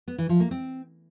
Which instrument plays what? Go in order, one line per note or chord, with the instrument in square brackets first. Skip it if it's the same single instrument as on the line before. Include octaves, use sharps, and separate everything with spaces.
[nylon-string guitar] B3
E3
F3
A#3
C4